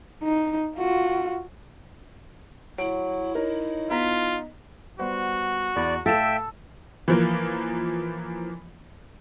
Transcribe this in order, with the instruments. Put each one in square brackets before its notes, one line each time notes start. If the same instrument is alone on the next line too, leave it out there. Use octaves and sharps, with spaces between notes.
[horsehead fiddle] D#4
F4 F#4
[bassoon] F#3 [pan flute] E4 [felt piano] D7
[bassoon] D#4 [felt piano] A#4 C#5
[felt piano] B3 A#5 B6 [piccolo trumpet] F4
[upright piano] G3 B3 C5 [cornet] F#4
[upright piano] E2 B5 [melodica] D5
[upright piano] A2 F5 E7 [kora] A4 [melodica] E5 G5
[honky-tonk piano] E3 F3 A#3